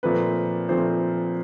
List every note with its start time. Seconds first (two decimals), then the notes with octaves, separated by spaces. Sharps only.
0.03 A#2 F3 A3 C4 B4
0.69 A#2 F3 A3 C4 C5